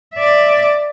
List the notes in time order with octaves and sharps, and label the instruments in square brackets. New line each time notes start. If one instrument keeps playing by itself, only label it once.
[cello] D5 E5